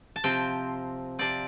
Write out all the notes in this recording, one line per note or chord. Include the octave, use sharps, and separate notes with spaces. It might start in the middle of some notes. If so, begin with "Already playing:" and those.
A5
C3 F3 C4 G5
C3 F3 C4 D5